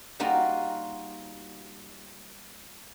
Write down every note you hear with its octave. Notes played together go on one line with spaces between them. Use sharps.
G3 A#3 D#4 F4 F#4